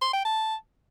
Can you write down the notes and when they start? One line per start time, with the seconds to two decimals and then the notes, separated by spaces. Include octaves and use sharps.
0.02 C6
0.13 G5
0.25 A5